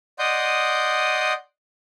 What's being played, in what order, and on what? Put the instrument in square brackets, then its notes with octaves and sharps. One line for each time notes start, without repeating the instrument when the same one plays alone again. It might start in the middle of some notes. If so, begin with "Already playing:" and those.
[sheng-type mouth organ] D5 D#5 F#5 C6 D#6 G6